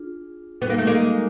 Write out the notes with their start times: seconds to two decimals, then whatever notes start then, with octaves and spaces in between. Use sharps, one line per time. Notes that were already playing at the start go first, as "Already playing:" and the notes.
Already playing: D4 F4 G#4
0.61 G3 B3 C4 D#4 F#4 A4
0.70 A#3
0.78 A3
0.87 G#3 A#3